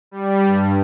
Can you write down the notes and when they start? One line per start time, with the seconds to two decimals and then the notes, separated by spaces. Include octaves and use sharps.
0.11 G3
0.45 G2